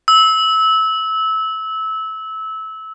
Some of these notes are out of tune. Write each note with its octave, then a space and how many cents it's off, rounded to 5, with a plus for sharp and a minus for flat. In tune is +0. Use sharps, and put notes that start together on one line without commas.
E6 -20